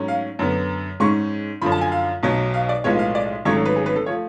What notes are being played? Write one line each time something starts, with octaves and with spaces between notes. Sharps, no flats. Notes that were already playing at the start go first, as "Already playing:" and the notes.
Already playing: G#2 F#3 A3 C#4
F5
F#2 D3 F#3 B3
G#2 G#3 C#4 C#6
F#2 D3 F3 B5
A5
G#5
F5
B1 B2 F#3
F5
D5
B1 A2 F3 G#3 B3 C#5
F5
D5
G#1 G#2 F#3 A3 C#4 C#5
A4
B4
G#4
B4
A4
F3 A3 C#5